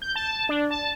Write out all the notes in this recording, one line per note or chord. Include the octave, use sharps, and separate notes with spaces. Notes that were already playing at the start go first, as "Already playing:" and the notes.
G6
A5
D4
A5